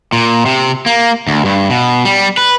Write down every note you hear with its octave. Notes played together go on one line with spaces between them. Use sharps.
A#2
C3
A#3
D2
G2
B2
G3
B4